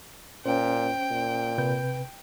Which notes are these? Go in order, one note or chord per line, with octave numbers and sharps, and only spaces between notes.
A#2 C#4 C5 G5
A#2
C3 B4 G6